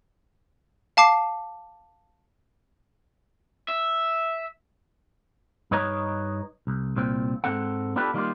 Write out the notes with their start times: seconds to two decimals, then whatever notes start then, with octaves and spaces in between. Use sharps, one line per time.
0.97 F5 A5 D6 C7
3.69 E5
5.71 G2 D#4 B4 C#5 D#5 A#5
6.67 C2
6.96 C2 A#2 C4
7.44 G#2 E3 G#3 C4 A4 F#5
7.96 B3 D4 F4 G4 A4 B4
8.14 D#3 G3 A#3 D4 D#4 F4